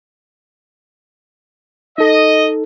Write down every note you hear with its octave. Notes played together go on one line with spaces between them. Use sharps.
D#4 A4 D#5